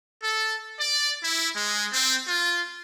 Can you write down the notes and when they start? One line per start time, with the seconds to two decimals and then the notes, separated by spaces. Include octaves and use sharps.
0.21 A4
0.79 D5
1.23 E4
1.56 G#3
1.93 C4
2.28 F4